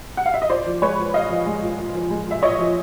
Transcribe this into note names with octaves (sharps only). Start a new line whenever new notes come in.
F#5
F5
E5
D#5
A#2 C5 D5
F3
G#3 B4 C#5
A#2
A#2 D#5 F5
F3
G#3
A#2
A#2
F3
G#3
A#2 E5
A#2 C#5 D#5
F3